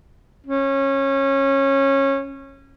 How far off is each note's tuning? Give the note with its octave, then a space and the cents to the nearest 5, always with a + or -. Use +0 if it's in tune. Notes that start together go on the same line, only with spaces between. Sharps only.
C#4 -20